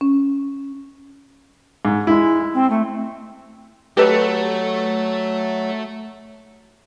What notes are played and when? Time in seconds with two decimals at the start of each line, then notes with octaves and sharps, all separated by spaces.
0.01 C#4
1.85 G#2
2.07 G#3 E4
2.54 C4
2.70 A3
3.97 F#3 A3 G4 A4 B4 D#5